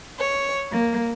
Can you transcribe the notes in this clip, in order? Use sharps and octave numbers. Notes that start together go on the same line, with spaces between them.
C#5
A#3